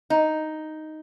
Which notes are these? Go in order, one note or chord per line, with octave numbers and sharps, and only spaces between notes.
D#4